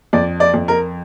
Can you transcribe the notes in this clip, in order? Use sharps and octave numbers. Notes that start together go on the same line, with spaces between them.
F2 D5
D5
F2
A#4